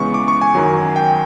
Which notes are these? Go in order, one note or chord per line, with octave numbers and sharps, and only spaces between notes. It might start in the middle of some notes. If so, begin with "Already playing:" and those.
Already playing: C#3 E3 G#3 B3 C#6
D6
C#6
G#5
F#2 D#3 F#3
G5